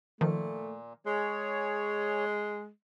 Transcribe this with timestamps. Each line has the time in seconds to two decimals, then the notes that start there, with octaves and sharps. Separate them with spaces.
0.21 A#2 D#3 F3 A3
1.06 G#3 G#4 C#5